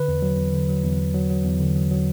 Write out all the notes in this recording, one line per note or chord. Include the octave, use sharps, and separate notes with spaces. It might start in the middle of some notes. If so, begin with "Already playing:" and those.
Already playing: D3 B4
E2
F#3
E2
D3
F#3
E2
E2
F#3
F#3
E2
D3
F#3
F#3